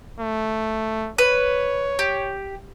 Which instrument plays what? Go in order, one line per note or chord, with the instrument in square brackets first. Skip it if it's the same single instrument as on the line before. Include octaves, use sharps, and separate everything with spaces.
[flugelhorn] A3
[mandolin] B4 [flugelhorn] C#5
[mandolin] G4